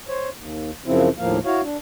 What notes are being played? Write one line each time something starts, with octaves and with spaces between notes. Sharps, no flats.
C5 C#5
D#2
F#2 C#3 F3 C4 E4
D#2 A2 F3 A#3 F5
E4 F#4 C#5 F5
D4